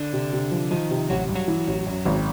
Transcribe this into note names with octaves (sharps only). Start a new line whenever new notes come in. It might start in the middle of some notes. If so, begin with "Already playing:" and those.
Already playing: D3 D4
C3
C3
F3
D#3 F3 D#4
C3
A1 F#3 F#4
G2
F#3 F#4
E3
A1
F#2
G#1